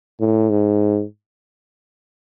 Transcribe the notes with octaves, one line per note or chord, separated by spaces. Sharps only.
A2
G#2